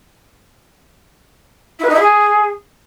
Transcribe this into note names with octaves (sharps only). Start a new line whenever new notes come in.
E4
B4
D#4
E4
G#4